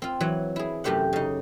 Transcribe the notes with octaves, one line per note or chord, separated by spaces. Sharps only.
C4 F4
E3 F#3 F#5
E4 G#4
F#2 C3 A3 G4 C5 F#5
C#3 D#4